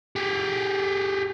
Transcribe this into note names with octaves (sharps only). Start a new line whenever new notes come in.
G4 G#4